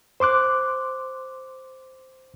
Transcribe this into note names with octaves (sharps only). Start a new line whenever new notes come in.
C5 C6 D6 F#6